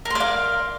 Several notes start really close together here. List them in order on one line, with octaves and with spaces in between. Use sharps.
A#4 C6 D5 F5